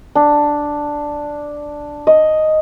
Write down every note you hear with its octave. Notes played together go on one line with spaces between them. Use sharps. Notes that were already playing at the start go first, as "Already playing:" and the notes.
D4
D#5